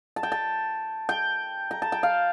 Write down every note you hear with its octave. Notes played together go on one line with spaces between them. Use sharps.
A5
G5
A5
G5
A#5
A5
G5
F5